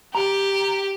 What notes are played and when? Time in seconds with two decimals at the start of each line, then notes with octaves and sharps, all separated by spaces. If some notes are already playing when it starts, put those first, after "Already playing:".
0.15 G4 A#5